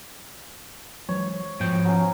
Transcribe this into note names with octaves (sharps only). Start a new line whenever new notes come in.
E3 F#3 G#3 C#5
G#2 B2 F3 G5
F#3 C#4